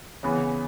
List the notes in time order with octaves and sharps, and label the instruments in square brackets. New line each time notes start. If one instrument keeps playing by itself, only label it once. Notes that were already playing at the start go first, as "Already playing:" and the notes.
[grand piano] C#3 E3 B3